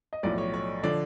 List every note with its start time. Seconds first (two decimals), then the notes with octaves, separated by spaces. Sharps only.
0.13 D#5
0.23 B1 A2 F3 D5
0.38 C#5
0.54 C#5
0.83 D3 F3 D5